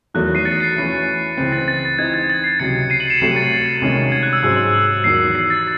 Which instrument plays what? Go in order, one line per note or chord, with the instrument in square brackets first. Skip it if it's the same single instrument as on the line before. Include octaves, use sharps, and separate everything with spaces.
[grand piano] E2 D#3 F#3 A3 [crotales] F#6
[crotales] C7 D#7
A6 C#7
C7
[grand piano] E3 A3 C#4 E4
C#2 C#3 E3 C4
[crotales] A6
A6
[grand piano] E3 C4 D#4 [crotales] G#6
[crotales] G#6
A6
C7
[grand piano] C#2 C3 F#3 [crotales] A6 C#7
[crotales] C7 D#7
D#7 F#7
C#7 E7
[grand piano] C2 C3 F#3 A3 [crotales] C7 D#7
[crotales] A6 C#7
C7
A6
[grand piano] C2 C3 D#3 G#3 C#4
[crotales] G#6
F#6
E6
[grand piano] G#2 F#3 C#4 G#4 C5 [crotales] F#6
[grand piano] E2 D#3 F#3 [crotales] C7
[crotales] C7
A6